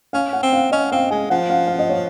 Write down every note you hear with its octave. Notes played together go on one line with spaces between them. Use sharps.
C#4 F5
F#5
C4
F5
C#4 D#5
C4 F5
G#3 G#5
F3 F#5
F5
F5
D#5
C#5